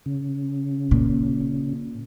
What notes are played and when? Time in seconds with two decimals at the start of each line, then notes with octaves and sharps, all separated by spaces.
0.06 C#3
0.91 A#2